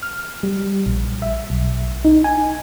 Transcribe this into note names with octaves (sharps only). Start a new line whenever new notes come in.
F6
G3
A#1
E5
B1
D#4
G#5